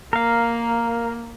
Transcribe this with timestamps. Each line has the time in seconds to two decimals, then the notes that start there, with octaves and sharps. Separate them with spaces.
0.13 A#3 A#4 F5